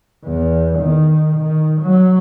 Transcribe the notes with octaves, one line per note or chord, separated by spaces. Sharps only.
E2
D#3
D#3
F#3